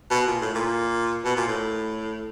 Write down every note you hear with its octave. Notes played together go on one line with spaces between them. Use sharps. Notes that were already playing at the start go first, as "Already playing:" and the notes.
B2
A#2
A2
A#2
B2
A#2
A2